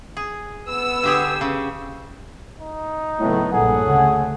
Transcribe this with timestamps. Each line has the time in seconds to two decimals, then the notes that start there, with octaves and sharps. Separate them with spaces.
0.17 G#4
0.68 B3 E6
1.03 D3 G4 G#4
1.41 C#3
2.60 D#4
3.20 A2 C#3 F#3 B3
3.53 A#1 G2 A#2 G#4 A4 C#5 F#5
3.86 D2 C#3 A3